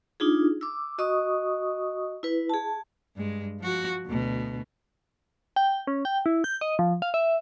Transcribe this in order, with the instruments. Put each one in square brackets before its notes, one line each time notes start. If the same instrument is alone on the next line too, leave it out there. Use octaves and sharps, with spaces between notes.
[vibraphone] D4 D#4 F4 G#4
D6 E6
F#4 D#5 C#6 D#6
E4 B4
G#4 A5
[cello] G2 G#3
F3 F#4
D2 B2
[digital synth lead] G5
C#4
G5
E4
G6
D#5
F3
F5
E5